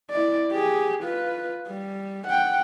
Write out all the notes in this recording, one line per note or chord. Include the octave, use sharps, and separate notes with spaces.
E4 D5
G4 G#4
F4 B4
G3
F#5 G5